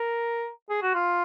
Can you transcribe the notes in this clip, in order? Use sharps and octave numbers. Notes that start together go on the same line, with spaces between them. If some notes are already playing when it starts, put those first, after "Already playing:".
Already playing: A#4
G#4
F#4
F4